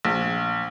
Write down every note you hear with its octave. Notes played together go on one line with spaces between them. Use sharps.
A#1